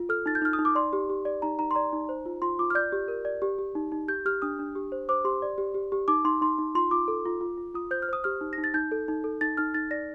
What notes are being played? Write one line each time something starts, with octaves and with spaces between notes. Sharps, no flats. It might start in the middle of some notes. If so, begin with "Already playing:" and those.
Already playing: F4
A4 F6
D#4 A6
G6
D#4 F6
D#6
D#4
D6
D5 C6
G4
G4
D5
D#4 A#5
D#4 A#5
C6
D5 A#5
D#4
C5
F4
F4 C6
F4 D6
F6
D5 G6
G4
A#4
D5
G4
G4
D#4
D#4
G4 G6
G4 F6
D4 D#6
D4
G4
C5
C5 D6
G4 C6
D5
G4
G4
G4
D#4 D6
D#4 C6
D#4 C6
D#4
F4 C6
F4 D6
A4
F4
F4
F4
F4 D#6
C5 G6
F6
C5 D#6
G4 F6
D#4
A#6
D#4
A6
D#4 G6
A4
D#4
A4
D#4 A6
D#4 F6
D#4 A6
D5 A#6